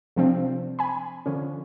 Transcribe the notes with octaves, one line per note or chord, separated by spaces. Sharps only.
C3 F3 C4 D4
G#5 B5
D3 F3 C#4